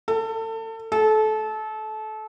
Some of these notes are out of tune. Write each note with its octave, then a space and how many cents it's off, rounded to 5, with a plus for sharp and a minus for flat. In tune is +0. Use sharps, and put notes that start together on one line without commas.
A4 +30
A4 -25